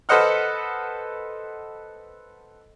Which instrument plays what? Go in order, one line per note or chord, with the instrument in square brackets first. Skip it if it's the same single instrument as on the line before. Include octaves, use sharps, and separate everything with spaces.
[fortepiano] A4 B4 C5 D#5 F#5 F6